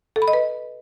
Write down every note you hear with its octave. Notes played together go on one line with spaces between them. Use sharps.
A4
B5
D#5
B4